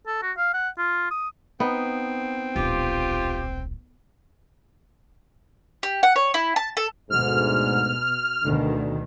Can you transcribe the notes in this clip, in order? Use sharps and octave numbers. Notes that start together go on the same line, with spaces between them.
A4
F#4
F5
F#5
F4
D#6
B3 C4 D#4
D1 A#1 F4 G4
G4
F#5
C#5
E4
A5
A4
D2 G#2 B2 F6
D2 B2 D3 D#3